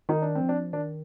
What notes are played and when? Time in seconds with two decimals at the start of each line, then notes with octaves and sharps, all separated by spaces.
0.09 D#3 D#4
0.22 D4
0.35 C4
0.41 F3
0.49 D4
0.73 D#3 D4